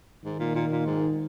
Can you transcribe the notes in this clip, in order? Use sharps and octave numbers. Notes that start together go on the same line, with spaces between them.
G#2 D#3
A#2
A#2
A#2
G#2